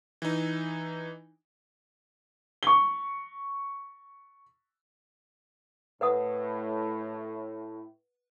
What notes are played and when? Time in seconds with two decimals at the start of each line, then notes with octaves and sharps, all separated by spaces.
0.22 E3 D#4
2.63 C#6 G7
6.01 A2 B4 F#5 D#6